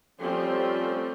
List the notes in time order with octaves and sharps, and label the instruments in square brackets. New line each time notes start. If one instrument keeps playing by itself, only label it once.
[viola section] F3 A3 C4 [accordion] G3 C#4 G4 [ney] A4